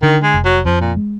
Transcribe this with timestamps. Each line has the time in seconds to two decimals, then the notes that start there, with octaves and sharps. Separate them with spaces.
0.02 D3 D#3
0.23 G#3
0.34 F1
0.45 F#3
0.65 F2 F3
0.81 A#2
0.97 G#3